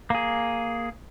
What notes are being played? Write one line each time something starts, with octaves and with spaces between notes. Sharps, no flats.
A#3 G#4